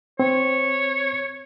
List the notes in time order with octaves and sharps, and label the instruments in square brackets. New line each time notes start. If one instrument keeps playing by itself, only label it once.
[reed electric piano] C4 [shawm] C#5